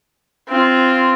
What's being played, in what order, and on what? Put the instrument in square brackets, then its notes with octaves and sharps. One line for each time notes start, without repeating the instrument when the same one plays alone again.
[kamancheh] C4 F4